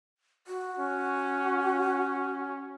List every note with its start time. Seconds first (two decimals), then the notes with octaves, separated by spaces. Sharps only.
0.47 F#4
0.79 C#4